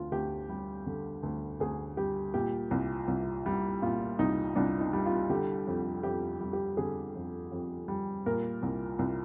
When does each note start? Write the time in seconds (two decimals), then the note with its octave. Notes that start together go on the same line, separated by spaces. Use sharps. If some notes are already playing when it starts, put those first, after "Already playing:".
Already playing: D2 F4
0.12 D2 G4
0.49 G3
0.86 D3
1.23 D2
1.60 D2 G#4
1.97 G3 G4
2.34 A#2 G4
2.71 C2
3.08 C2
3.46 G3
3.82 A#2 F4
4.19 C2 D#4
4.56 C2 D4
4.81 D#4
4.93 G3
5.06 F4
5.30 D3 G4
5.67 F2
6.03 F2 G4
6.41 G3
6.53 G4
6.77 D3 G#4
7.15 F2
7.52 F2
7.88 G3
8.26 A#2 A#4
8.63 C2
8.99 C2